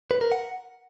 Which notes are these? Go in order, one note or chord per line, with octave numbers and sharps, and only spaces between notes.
B4
A#4
F#5